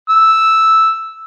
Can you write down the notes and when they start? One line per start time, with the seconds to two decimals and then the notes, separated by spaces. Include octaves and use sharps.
0.09 E6